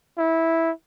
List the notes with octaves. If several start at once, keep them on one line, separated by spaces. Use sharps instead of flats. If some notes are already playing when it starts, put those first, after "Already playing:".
E4